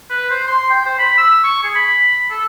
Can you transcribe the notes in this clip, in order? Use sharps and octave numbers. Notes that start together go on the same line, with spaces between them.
B4
C5
C6
G5
C5
B5
E6
C#6
G#4
B5
A4